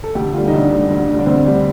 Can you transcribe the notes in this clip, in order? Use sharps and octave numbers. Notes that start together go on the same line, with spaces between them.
A4
D2 G4
D3 G3 F4
D#4
D2 D4
D3 G3
D2
D3 G3
D4
D2 C4
D3 G3